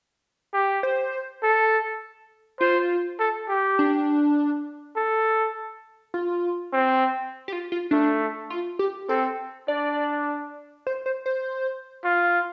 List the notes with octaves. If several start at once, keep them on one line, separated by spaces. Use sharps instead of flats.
G4
C5
A4
F4 C5
A4
G4
D4
A4
F4
C4
G4
F4
F4
A3 D4
F4
G4
C4 A4
D4 D5
C5
C5
C5
F4